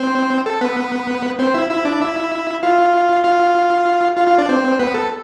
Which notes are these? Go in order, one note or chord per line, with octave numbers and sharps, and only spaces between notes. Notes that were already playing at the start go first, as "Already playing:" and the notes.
Already playing: C4 C5
A4
B3 B4
C4 C5
E4 E5
E4 E5
D4 D5
E4 E5
F4 F5
F4 F5
F4 F5
F4 F5
D4 D5
C4 C5
B3 B4
A4